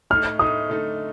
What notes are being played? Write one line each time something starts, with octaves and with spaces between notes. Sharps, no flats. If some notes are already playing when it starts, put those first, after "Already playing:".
A2 A3 D#4 A4 F6
A2 A3 D#4 A4 D#6
D3 A3 D#4 A4